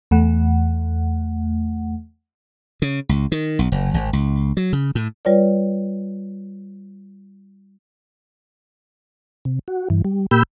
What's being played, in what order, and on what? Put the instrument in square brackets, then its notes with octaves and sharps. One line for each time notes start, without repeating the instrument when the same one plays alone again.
[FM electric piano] E2 A3 F#5
[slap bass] C#3
C#2
D#3
B1
F#1
G#1
C#2
F#3
C#3
A2
[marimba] G3 F4 B4 C#5 D5
[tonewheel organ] C3
F#4
G2 E3
G3
A#2 A#3 G4 B5 E6 G6